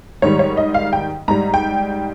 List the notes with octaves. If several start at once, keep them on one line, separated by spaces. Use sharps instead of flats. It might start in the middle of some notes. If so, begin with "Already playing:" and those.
G#2 D#3 G3 C#5
C#5
D#5
F5
G5
G#2 G3 A#5
G5